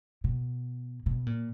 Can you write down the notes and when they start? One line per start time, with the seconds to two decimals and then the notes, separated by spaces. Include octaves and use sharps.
0.24 B2
1.06 B2
1.26 A#2